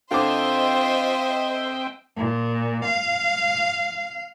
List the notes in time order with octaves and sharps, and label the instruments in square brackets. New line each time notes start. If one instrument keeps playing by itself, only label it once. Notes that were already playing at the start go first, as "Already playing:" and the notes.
[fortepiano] D3 D6 [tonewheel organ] C4 G5 [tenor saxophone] F4 [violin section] C5 D#5 E5
[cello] A#2
F5